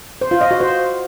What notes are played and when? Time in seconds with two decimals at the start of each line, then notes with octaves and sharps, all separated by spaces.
0.21 C5
0.31 F4
0.41 D#5
0.51 F#4
0.61 C5